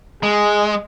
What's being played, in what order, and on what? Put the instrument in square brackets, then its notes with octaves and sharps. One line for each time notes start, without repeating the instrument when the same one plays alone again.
[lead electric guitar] G#3 [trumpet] G#4